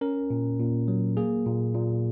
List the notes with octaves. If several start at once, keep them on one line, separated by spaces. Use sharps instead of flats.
C#4 A#4
A#2
A#2
F#3
A#3 G#4
A#2
A#2